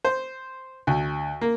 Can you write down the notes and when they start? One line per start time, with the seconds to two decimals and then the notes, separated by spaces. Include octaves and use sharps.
0.05 C5
0.87 D2
1.41 A#3